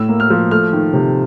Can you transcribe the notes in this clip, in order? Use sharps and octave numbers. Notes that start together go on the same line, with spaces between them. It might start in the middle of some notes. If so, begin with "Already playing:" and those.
Already playing: A2 E4 E6
A#3
F6
F3
A3 F6
D#3
C3